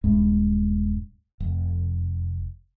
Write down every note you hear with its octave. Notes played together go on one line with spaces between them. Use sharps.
D#1 G2 G#3
F1